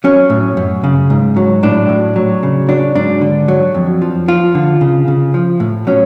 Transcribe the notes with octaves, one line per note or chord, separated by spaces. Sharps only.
F#3 C#4
A2
F#2
C#3
G#2
F#3
A2 D4
A2
F#3
C#3
F#3 D4
G#2 D4
D3
F#3
F2
F3
F3 F4
D3
C#3
C#3
F3
A2
F#3 C#4